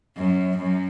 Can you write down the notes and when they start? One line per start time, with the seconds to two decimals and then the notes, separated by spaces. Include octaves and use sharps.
0.17 F#2
0.58 F#2